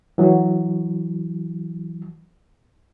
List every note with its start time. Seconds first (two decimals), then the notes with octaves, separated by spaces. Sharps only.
0.18 E3 F#3